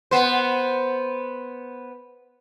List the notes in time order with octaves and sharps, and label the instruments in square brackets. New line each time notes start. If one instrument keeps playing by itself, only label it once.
[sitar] B3 C5